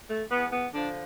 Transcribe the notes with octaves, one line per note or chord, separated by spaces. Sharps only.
A3
E2 B3
B3
D3 F3 D4